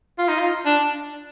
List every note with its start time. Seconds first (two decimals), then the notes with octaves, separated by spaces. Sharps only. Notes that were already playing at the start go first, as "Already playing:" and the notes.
0.18 F4
0.29 D#4
0.40 F4
0.66 D4